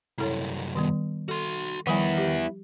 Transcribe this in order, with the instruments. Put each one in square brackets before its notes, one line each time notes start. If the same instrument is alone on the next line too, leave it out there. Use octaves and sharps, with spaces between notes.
[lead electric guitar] C2 F#2 [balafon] E4 A4 C#5
[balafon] D#3 G3 B3
[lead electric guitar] F#4 C6 [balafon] A4
[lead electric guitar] D#3 [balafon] F3 G3 G#5 [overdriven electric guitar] B3 E4
[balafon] G4